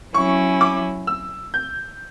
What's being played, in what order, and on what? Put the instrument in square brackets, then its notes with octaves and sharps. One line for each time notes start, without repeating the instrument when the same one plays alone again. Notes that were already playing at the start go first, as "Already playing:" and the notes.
[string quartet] F#3 C#4 E4 [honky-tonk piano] C#6
[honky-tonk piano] D6
E6
G6